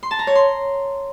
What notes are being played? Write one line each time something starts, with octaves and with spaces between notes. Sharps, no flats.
C6
A5
A#5
C#5
C6